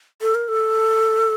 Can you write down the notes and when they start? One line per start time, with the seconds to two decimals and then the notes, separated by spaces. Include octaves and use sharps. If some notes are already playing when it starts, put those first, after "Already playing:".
0.22 A4
0.35 A#4
0.48 A4